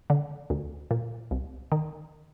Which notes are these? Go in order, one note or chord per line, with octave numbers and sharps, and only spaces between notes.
D3
D2
A#2
C2
D#3